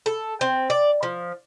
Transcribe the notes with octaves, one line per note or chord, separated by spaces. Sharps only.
A4
C4
D5
F3